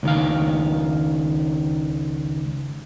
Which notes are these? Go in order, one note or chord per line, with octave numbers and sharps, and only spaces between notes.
C#2 D#3 F5